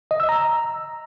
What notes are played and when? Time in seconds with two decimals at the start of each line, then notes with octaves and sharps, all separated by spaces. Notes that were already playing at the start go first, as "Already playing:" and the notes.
0.11 D#5
0.20 E6
0.29 A#5